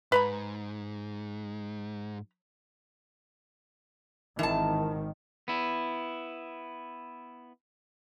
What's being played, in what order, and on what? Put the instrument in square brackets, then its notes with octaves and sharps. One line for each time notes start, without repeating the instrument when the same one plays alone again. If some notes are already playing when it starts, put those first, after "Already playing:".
[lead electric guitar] G#2 [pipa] B4 A#5 B5
[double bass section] G#1 D#3 [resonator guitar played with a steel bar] E3 A5
[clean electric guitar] B3 E4